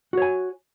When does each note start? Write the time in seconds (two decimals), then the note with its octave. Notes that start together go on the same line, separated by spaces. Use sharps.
0.13 F#4
0.17 C#5
0.22 G#5